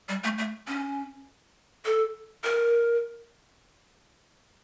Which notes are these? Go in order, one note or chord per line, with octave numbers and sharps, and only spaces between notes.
G3
A3
A3
C#4
A4
A#4